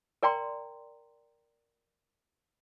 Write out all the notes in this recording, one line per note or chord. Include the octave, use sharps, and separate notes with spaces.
A#4 D5 G5 A#5 C6